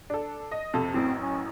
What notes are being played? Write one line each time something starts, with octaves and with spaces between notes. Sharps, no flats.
D4 A4
D#5
F2 C3 A4
A1 F#2 A2 C4
C#4